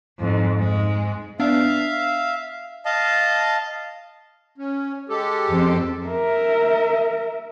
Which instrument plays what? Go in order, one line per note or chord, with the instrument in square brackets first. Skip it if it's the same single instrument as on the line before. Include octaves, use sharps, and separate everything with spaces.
[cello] F2 G#2
G#2 G#3
[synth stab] B3 D4 [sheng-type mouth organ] E5 F5
[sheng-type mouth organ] D#5 F5 A5
[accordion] C#4
G#3 G4 A4
[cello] F2 C4
[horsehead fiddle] A#4 E5